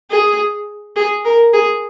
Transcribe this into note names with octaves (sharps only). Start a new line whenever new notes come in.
G#4
G#4
A#4
G#4